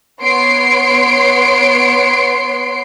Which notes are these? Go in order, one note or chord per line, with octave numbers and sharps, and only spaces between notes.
B3 C#5 C6 C7 D7